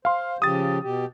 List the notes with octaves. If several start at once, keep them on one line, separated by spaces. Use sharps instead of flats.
C5 F5 C6
C#3 F3 G4 D#6 A6
B2 G4